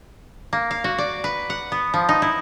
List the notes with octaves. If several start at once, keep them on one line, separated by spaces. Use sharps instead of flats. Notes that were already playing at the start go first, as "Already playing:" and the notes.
A#3
F5
F#4
D5
B4
F#5
B3
F3
D#4
E4